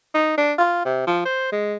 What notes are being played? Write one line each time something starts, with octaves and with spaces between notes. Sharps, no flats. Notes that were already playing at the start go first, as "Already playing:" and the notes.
D#4
D4
F4
C3
F3
C5
G#3